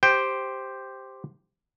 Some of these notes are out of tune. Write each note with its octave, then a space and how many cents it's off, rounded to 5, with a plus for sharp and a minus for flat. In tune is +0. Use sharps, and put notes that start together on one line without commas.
G4 +0 C5 +0 G5 +0